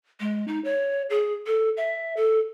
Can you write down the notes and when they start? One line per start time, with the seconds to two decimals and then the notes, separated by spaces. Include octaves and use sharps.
0.20 G#3
0.47 D#4
0.64 C#5
1.10 G#4
1.46 A4
1.77 E5
2.16 A4